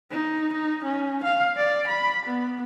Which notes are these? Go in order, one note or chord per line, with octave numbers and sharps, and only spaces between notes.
D#4
D#4
C#4
F5
D5
B5
B3